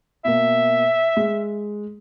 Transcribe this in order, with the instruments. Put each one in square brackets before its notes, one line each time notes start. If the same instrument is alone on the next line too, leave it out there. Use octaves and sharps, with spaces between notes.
[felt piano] B2 A#3 [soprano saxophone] E5
[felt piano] G#3